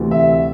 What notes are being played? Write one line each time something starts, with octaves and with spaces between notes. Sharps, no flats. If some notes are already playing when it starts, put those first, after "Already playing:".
Already playing: D2 C3 E3
E5